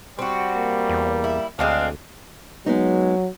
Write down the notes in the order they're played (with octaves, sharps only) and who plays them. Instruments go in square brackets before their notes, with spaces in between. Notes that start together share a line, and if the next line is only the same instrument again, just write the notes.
[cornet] G3 [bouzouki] C4 F#4
[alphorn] A#3
[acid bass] E2
[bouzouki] E4
[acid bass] D2 [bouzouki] G#3 C4 D4 [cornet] F5
[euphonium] F#3 [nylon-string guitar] G#3 B3 D#4